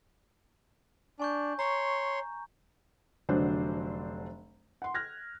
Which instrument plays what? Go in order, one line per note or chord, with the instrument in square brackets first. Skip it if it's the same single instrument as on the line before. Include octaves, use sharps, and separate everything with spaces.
[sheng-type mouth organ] D4 [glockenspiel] G#5 C#6 G6
[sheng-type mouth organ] C#5 C6 [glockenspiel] A#5
[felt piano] F1 D3 F#3 D4 C5
F#5 C6
F6 F#6 G#6 A#6